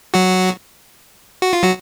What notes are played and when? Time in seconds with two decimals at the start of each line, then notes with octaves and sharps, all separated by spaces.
0.14 F#3 F#4
1.42 F#4
1.53 F4
1.63 F#3 F#4